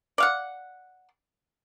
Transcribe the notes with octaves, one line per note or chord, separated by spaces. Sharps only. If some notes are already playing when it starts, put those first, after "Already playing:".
D5 F5 F#5